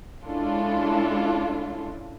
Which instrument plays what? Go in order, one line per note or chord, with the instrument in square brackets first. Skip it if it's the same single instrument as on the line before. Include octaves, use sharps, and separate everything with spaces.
[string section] G#3 C#4 D4 E4 F4 A4